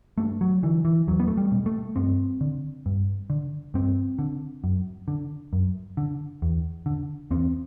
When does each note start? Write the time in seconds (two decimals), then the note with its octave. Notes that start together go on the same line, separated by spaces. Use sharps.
0.18 G2 A3
0.41 F#3
0.63 D3 E3
0.85 E3
1.08 E2 F#3
1.20 B3
1.28 A3
1.37 G3
1.52 B2
1.66 A3
1.96 G2 C4
2.41 D3
2.86 G2
3.30 D3
3.74 G2 C4
4.19 D3
4.64 F#2
5.08 D3
5.53 F#2
5.97 D3
6.42 E2
6.86 D3
7.31 E2 C4